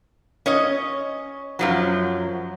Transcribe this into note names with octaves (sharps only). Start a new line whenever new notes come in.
C#4 C#5 D#5
F#2 F3 F#3